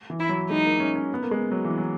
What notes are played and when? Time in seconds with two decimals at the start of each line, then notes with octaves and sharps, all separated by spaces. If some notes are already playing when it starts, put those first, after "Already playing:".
0.10 E3
0.20 E4
0.29 F#3
0.50 G#3 D#4
0.65 A#3
0.80 C#4
0.95 C#4
1.14 B3
1.23 A#3
1.31 G#3
1.51 F#3
1.65 E3
1.78 F#3